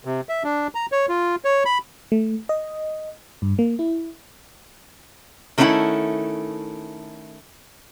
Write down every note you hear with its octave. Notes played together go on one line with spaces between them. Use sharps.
C3
E5
D4
A#5
C#5
F4
C#5
B5
A3
D#5
G2
A#3
E4
D#3 A3 C#4 D4 E4 F#5